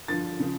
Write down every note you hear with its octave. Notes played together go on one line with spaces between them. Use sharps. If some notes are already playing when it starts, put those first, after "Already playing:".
G2 D3 F3 A6
C#3 F3